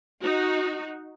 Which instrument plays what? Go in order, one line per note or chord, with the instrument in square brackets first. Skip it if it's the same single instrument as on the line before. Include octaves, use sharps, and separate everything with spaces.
[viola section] D#4 F#4